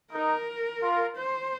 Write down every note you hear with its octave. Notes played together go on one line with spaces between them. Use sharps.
D#4 A#4
F4
C5